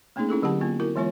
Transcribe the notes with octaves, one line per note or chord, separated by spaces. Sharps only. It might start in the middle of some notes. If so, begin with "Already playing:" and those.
A3 A#3 C4 C#4 D#4 G#4
C#4 E4 G#4 A4
D3 F#3 G4 F#5 A5
A#3 B3 F4
E4 F#4 A#4
E3 G#3 B3 F4 C#5